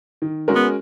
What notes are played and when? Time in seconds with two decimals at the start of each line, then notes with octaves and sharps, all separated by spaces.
0.22 D#3
0.48 G#3 C#4 F#4 A#4
0.55 B3